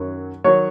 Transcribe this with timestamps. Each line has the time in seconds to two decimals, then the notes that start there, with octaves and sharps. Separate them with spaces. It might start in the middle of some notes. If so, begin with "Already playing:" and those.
Already playing: F#2 D#3 F#3
0.44 D#3 F#3 C#5